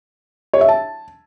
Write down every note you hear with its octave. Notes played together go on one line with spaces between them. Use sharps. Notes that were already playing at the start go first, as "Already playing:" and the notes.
C#5
E5
A5